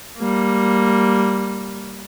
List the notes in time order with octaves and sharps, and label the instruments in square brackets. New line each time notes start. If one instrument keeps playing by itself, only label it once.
[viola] G3 A#3